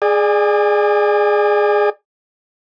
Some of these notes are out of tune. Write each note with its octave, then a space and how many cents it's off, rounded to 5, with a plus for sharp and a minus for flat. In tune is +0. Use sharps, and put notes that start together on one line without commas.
G#4 +0 D5 +20 G#5 -35